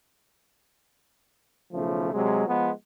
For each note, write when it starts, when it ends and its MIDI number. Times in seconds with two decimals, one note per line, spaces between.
1.72 2.13 35
1.72 2.13 49
1.72 2.13 53
1.72 2.13 57
2.13 2.47 48
2.13 2.47 54
2.13 2.47 56
2.47 2.70 53
2.47 2.70 56
2.47 2.70 59